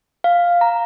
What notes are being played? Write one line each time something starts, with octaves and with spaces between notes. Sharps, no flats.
F5
A#5